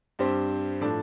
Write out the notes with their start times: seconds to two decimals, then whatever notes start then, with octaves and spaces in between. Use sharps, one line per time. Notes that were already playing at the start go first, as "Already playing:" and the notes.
0.19 G2 G3 C4 G4 C5
0.81 A2 F3 D4 A4 D5